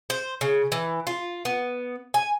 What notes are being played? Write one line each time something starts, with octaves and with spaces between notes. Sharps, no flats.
C5
C#3
E3
F4
B3
G#5